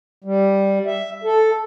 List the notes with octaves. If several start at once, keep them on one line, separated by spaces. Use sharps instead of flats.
G3
E5
A4